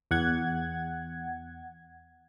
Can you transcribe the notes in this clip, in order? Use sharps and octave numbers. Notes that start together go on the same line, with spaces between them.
E2 F#5 G#6